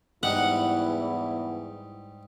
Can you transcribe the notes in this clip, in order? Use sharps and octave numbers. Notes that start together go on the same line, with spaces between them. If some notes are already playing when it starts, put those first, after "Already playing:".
E2 G#2 G3 D#4 E4 F#5